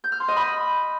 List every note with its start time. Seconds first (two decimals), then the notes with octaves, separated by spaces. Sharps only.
0.04 G6
0.12 F6
0.20 C6
0.28 D#5
0.36 B5